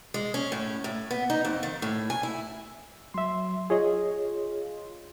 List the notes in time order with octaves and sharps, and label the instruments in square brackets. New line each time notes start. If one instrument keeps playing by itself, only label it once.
[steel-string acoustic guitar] G#3
C#4
A2
A2
B3
D#4
F2
D#3
A2
G#5
E4
[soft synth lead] F#3 [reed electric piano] E5 C6
[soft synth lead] F4 [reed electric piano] G#4 C#5 D#5